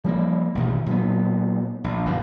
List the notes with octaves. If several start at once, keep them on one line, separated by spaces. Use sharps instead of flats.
F3 G3 A#3
A1 B2 D#3
A#2 F#3 B3
A#1
G1 F#2 B2